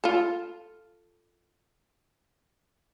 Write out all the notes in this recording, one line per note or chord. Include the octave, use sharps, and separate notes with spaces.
F4 A4